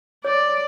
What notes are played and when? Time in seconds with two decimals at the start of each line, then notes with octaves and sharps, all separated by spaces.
0.25 C#5 D5